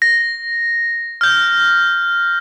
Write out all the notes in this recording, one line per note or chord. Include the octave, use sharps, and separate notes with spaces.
A#6
F6 G6